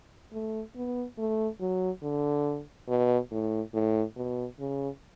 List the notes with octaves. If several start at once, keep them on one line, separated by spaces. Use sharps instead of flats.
A3
B3
A3
F#3
D3
B2
A2
A2
B2
C#3